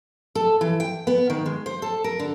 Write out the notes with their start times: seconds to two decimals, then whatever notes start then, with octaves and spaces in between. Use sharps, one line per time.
0.35 A4
0.61 E3
0.80 G5
1.07 B3
1.30 D#3
1.46 G#3
1.66 C5
1.82 A4
2.04 A#4
2.19 D3